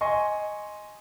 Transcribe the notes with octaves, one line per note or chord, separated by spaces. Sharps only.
D#5 G#5 C6 C#6